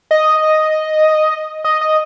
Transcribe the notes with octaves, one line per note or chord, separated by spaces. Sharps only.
D#5
D#5
D#5